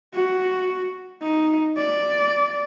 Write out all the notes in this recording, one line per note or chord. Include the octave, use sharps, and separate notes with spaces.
F#4
D#4
D5